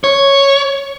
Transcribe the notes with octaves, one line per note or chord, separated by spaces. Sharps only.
C#5